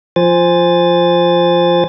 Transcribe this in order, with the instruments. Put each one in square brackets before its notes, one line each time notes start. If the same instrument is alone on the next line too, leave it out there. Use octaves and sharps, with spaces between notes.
[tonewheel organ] F3 C5 G#5 A6